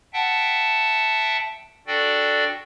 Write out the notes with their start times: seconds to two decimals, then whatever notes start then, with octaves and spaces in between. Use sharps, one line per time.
0.13 E5 F#5 G5 A5
1.87 D4 F#4 A4 D5 G5